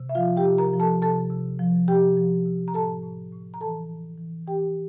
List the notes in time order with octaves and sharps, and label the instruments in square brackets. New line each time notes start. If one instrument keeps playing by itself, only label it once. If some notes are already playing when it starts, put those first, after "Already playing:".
Already playing: [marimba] C3
E5
F3 F4 F5
G4 G5
C3
A#4 A#5
F3
A4 A5
C3 A4 A5
C3
F3
C3 G4 G5
F3
C3
A#5
A2 A4 A5
A2
A2
A#5
E3 A4 A5
A2
E3
E3 G4 G5